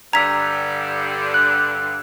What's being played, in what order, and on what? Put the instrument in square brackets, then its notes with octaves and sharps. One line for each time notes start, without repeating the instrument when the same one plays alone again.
[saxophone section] G2 D3 [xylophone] A#5 B6 [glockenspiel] E6 G#6
[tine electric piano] F#6